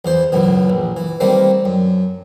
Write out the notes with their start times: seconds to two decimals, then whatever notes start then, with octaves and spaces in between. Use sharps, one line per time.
0.05 E2 E3 C5
0.32 C#2 F#2 B2 E3
0.70 A#1
0.97 E3
1.20 D#3 G3 A3 A#3 C4
1.65 F#2